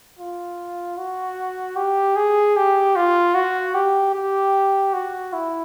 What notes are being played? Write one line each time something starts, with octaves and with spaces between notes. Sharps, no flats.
F4
F#4
G4
G#4
G4
F4
F#4
G4
G4
F#4
E4